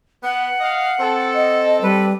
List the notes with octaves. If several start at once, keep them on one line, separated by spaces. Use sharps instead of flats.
B3 F#5
D#5 F5
C4 A4
D#5
G3 B4